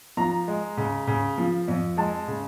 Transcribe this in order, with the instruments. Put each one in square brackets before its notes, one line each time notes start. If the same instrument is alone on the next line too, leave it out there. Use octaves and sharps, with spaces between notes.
[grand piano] F3 A#5
G#3
C#3
C#3
F3
F2
G#3 A5
C#3